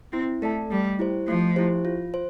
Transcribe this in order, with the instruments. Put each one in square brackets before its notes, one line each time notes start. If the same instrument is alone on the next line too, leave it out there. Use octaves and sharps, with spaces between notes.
[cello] C4 [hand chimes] E4
[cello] A3 [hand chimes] A4 D5 A5
[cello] G3 [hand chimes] A3
[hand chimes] E4 G4 C5
[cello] F3 [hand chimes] A3
[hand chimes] E4 G4 C5
F4
C5